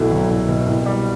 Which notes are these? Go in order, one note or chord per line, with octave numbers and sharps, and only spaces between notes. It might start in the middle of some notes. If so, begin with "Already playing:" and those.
Already playing: C2 B2 F#3 A3 E4
F#3
C2
B2
C2
G3